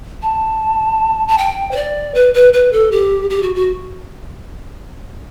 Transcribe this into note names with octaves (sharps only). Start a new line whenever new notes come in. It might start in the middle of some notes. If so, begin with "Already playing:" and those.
A5
A5
G5
C5
D5
B4
B4
B4
A4
G4
G4
F#4
F#4